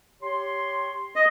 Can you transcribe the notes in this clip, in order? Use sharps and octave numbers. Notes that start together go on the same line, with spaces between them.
G4 C#5 C6
D#5